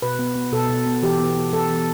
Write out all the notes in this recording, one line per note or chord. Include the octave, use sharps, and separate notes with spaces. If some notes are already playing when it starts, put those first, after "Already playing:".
B2 B4
B3
B3
B2 A4
B2
B3
E3 G4
B3
B3
E3 A4
E3